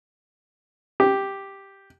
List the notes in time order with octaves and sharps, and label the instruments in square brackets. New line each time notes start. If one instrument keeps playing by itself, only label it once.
[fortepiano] G4